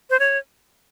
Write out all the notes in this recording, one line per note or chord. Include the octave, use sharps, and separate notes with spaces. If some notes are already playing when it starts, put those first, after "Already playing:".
C5
C#5